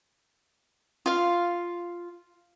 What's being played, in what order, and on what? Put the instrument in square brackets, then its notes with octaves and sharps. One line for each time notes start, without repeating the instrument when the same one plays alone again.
[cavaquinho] F4 F5